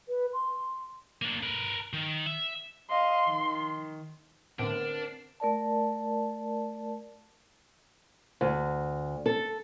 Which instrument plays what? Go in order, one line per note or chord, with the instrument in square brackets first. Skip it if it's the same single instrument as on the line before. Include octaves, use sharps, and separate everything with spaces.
[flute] B4
C6
[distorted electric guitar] A#3 D4
A#4 B4
D#3
E5
[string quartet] D#5 F5 [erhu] C6
[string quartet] D#3
[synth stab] A2 D3 [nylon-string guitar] B3 C4 [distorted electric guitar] D4 [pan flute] A#4
[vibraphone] A3 A#4 D5 A5
[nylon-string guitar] D2
A4